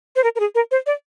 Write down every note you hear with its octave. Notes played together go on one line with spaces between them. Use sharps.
C5
A#4
A#4
G#4
A#4
C5
D5